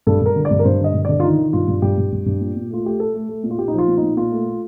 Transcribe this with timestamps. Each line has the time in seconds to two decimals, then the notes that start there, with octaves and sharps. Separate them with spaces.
0.07 G2 A4
0.21 G2 A#4
0.36 D3
0.45 D5
0.51 G2
0.59 A#4
0.64 G2 C5
0.80 D3 D#5
0.94 G2
1.05 D3 D5
1.20 F4
1.23 D#3 D#4
1.38 D#3
1.53 G2 F4
1.68 G2
1.82 G2 G4
1.98 G2
2.12 G2
2.26 G2
2.41 A#2
2.56 A#2
2.70 A3 F4
2.85 A3 G4
2.99 A3 A4
3.14 A3
3.29 A3
3.43 A#2
3.51 F4
3.58 A#2 G4
3.68 D#4
3.74 F3 F4
3.88 A#2
3.97 D#4
4.03 A#2
4.17 A#2 F4
4.32 A3
4.46 A3